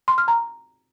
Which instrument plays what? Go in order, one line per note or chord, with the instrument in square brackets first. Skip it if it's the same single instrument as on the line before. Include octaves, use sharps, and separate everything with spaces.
[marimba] C6
F6
A#5